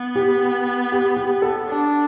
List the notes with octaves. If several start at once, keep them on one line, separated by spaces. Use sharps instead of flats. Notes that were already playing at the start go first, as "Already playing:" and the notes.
Already playing: B3
G4
G4
G4
A4
D4